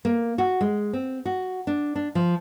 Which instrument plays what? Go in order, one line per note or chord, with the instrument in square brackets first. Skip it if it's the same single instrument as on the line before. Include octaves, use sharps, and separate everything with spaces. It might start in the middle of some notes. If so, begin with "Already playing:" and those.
[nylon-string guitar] A#3
F#4
G#3
C4
F#4
D4
D4
F3